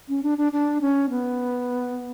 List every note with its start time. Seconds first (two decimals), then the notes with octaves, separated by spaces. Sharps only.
0.09 C#4
0.23 D4
0.38 D4
0.52 D4
0.81 C#4
1.10 B3